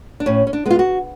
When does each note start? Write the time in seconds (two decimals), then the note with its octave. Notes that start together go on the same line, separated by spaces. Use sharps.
0.20 D4
0.26 A2 C#4
0.47 C#4
0.53 D4
0.66 G#3 B3 F4
0.79 F#4